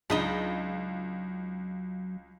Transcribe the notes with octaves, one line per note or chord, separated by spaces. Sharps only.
C#2 F#3 D4 D#4 F4 D#5 B5